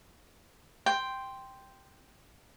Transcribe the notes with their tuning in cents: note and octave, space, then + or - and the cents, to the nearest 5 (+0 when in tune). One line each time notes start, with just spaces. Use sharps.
G5 +0 C6 +0